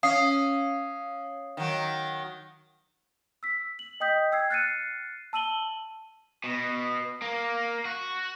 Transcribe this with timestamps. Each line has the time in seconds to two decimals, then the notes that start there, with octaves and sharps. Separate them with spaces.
0.03 C#4 F5 D#6 C7
1.57 D#3 F#3
3.43 E6 B6
3.79 F#7
4.00 D#5 G5 D#6 G6 B6
4.32 G5 E6 G#6 C7
4.50 F6 F#6 A6 C7 C#7 D#7
5.33 A5 E6 D#7 F#7 G7
6.44 B2
7.22 A#3
7.85 F#4